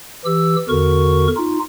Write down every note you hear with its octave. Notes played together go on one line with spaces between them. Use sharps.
E3 G4 E6
E2 D3 F#4 A#4 C#6
D#4 F4